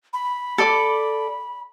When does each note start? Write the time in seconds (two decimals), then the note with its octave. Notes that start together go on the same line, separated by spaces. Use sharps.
0.13 B5
0.58 A4 D5 D6